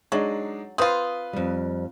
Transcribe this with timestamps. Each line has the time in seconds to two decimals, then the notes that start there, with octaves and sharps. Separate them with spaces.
0.12 F#3 G#3 D4 D#4
0.78 C4 F4 B4 D#6
1.33 F2 G3